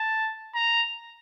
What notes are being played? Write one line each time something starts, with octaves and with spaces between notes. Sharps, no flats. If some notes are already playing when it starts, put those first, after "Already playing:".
Already playing: A5
A#5